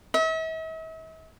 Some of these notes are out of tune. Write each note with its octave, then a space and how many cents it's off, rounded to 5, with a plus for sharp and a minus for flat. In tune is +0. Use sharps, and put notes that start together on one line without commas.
E5 -45